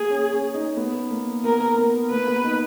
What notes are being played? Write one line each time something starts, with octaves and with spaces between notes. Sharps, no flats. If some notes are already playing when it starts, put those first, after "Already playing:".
Already playing: A#3 G#4
C#4
C#4
D#4
B3
A#3
B3 A#4
B3
A#3 B4
B3
D#4